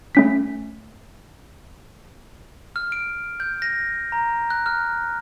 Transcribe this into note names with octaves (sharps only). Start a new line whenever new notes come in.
A3 C#4 B6
F6
D7
G6
A#6
A#5
F#6
F6